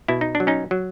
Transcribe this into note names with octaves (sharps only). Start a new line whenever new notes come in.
B2 E4
D#4
D4
F#3
C#4 D#4
F#3